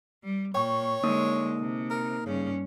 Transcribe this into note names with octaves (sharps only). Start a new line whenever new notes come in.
G3
A#2 C#5 G5 C#6
D3 G#3 A#3 D#4 D#6
C3
A#4
G2 C#3 C#4